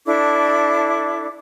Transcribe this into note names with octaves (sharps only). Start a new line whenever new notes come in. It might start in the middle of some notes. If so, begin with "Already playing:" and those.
D4 E4 A4 D6